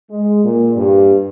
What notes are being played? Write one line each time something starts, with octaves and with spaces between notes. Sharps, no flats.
G#3
A#2
G2